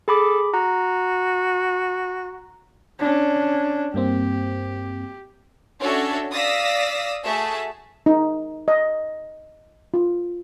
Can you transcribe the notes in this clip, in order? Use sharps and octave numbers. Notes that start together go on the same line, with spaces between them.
G#4 A4 B5 D6
F#4 A#5
C#4 D4
G2 A#3 C4 G4
C#4 D4 F#4 A4 C#5 E5
D5 F5 D#6 E6 A#6 B6
A3 F#4 G#4 E5 A5
D#4
D#5
F4